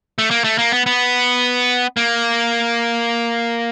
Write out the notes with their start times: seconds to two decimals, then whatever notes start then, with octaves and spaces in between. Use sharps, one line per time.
0.19 A3
0.31 A#3
0.44 A3
0.58 A#3
0.72 B3
0.86 B3
1.97 A#3